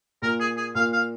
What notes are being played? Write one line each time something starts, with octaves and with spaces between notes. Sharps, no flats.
A#2 A#4
G#4
G#4
A#2 F5
F5